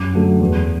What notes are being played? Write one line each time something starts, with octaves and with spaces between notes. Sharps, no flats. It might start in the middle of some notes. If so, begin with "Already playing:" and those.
Already playing: F#2 D6
D3 F#3 A3
E2